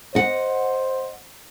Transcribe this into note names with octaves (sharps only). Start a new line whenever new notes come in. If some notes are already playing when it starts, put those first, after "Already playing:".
C5 D#5 F#5